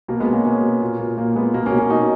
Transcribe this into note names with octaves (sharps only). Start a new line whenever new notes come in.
B2 A#3
G#3 B3
B2
A#3 C#4
B2 A#3 C#4
B2
A#2
A#2
A#2 A#3
A#2 G#3 B3
B2 A#3
A#3 C#4
B2
A#3 C#4
B2 D#4 F#4